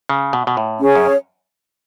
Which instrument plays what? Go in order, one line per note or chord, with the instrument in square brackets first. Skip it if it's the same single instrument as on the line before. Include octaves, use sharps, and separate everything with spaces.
[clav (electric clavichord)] C#3
B2
B2
A2
[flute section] C#4 G#4 C#5
[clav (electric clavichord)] F#2